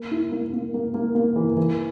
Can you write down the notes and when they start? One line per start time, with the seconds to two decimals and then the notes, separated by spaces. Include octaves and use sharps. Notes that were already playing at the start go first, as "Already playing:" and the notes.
Already playing: A#3
0.11 E4
0.32 A#3
0.53 A#3
0.74 A#3
0.94 A#3
1.15 A#3
1.36 E3
1.57 E3